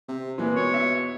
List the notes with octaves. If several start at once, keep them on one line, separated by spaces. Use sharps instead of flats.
C3
A#2 E3 G#3 B3
B2 C#5
E5